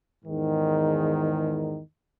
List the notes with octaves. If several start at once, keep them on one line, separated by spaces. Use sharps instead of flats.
E2 G#2 D#3